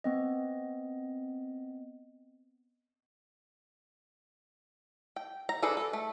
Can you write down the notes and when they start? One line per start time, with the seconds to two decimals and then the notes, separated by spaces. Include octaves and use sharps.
0.04 B3 C4 D#5
5.16 G5
5.49 A#5
5.62 D4 G#4 A4 B4 C5
5.77 A4
5.93 A3